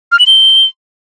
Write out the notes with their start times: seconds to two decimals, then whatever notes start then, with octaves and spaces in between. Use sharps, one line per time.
0.12 F6
0.19 F#7
0.26 G7